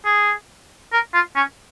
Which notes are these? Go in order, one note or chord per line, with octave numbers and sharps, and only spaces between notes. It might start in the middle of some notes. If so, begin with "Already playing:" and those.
G#4
A#4
F4
C#4